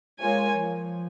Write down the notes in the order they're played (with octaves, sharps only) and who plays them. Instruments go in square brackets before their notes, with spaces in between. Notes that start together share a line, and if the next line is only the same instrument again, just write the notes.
[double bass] G#3 [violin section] A#3 F4 C#5 G#5
[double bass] F3